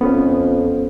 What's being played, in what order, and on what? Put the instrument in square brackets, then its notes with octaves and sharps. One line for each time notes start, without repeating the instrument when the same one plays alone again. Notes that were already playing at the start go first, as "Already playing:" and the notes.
[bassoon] F2 [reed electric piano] B3 C#4